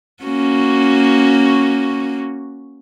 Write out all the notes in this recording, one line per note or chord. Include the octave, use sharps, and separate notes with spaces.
A#3 C#4 F#4